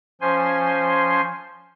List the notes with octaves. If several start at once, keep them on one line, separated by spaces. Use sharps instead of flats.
F3 C#4 C5 G#5 C6